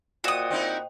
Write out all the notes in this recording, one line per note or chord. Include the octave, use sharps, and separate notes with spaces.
A#2 F#4 C5 D#5 G5 D#6
C4 D#4 E4